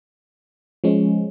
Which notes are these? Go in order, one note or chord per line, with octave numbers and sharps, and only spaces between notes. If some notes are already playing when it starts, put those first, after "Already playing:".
F3 G#3 C#4